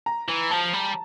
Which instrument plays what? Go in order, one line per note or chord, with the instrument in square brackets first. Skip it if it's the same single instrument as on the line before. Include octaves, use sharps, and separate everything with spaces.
[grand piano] A#5
[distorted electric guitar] E3
[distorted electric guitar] F3 [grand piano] A5
[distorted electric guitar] G3